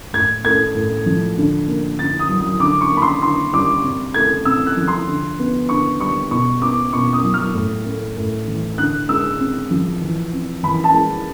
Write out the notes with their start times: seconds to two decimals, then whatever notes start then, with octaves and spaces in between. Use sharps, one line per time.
0.13 A2 G#6
0.45 A3 G#6
0.75 A2
1.06 F3
1.38 D3
1.68 A#3
1.99 D3 A6
2.19 D#6
2.29 F#3
2.40 D#6
2.60 D3 D6
2.81 C#6
2.92 A#3
2.97 B5
3.02 C6
3.22 D3 C6
3.53 G3 D6
3.84 C3
4.14 A3 G#6
4.45 C3 E6
4.66 F#6
4.77 F3
4.87 C6
5.07 D3
5.39 B3
5.69 D3 C#6
6.00 G3 C#6
6.31 B2 C#6
6.61 B3 D6
6.93 B2 C#6
7.13 D#6
7.24 F#3
7.34 F6
7.55 A2
7.86 A3
8.16 A2
8.47 E3
8.78 D3 F#6
9.09 G#3 E6
9.39 C4
9.71 F3
10.01 E3
10.33 C4
10.63 E3 B5
10.84 A5
10.94 G#3